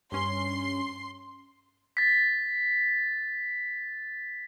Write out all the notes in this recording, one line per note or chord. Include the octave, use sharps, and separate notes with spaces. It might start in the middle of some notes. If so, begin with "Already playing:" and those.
G2 C#4 C6
A6 B6